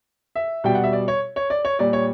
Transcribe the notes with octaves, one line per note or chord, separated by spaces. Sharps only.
E5
B2 G3 G5
F#5
E5
D5
C#5
C#5
D5
C#5
A#2 G3 D5
C#5